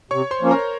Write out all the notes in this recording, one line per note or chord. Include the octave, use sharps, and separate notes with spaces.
C3 C#5 C#6
C5 C6
F3 A#3 C#4
A#4 A#5